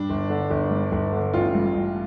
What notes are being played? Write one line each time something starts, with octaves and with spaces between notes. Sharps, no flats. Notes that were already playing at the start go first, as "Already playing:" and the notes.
Already playing: G2 D4
G1
D3
G1
G2
G1
D3
A1 F4
G2
A1